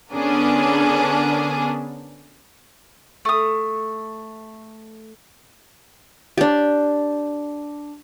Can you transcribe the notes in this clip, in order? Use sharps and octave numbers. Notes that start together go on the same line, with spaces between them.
D3 B3 C#4 D4 G#4 A#4
A3 D#6
D4 G4